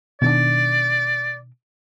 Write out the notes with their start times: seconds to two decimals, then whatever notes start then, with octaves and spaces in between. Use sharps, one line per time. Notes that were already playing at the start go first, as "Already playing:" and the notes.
0.22 B2 D#3 D4 D5